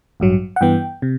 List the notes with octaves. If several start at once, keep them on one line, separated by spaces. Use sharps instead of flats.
A1 G2 F#3
F#5
G2 E3 B3 G5
C3